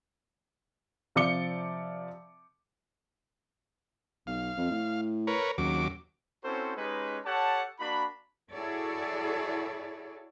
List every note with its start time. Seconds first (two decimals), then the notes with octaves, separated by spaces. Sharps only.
1.16 C3 F3 D5 D6 C#7 G7
4.27 B1 F5
4.57 F2
4.71 A2
5.27 A#4 B4 C#5
5.58 D#2 C#3 F#3 D6
6.43 C4 C#4 E4 F#4 A4 C5
6.76 G#3 C#4 D#4 G4 B4
7.24 G4 A4 C#5 F#5 A5
7.78 A#3 D4 F#4 B5
8.51 E4 F#4 G#4 A4 C#5 D5